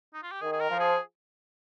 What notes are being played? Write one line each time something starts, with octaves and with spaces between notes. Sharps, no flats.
D#4
F4
G4
D#3 G#4
G#4
A#4
F3
G#4